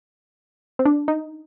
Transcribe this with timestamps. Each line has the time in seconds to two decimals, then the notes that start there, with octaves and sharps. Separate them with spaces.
0.79 C4
0.85 D4
1.08 D#4